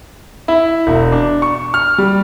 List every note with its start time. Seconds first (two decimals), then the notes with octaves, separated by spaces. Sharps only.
0.48 E4
0.87 E1
1.12 D4
1.42 C#6
1.74 F6
1.98 G3